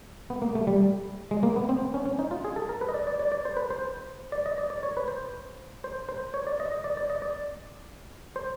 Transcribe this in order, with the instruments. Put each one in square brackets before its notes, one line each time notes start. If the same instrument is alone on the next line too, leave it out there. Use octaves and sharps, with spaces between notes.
[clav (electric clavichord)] B3
A#3
A3
G3
G#3
A#3
B3
C4
C#4
C#4
D#4
F4
G#4
A4
A#4
B4
D#5
D5
D5
D5
D5
C5
B4
C5
D5
D#5
D5
D5
C#5
B4
C5
C5
C5
C#5
D5
D#5
D#5
D5
D5
D#5
D5
C5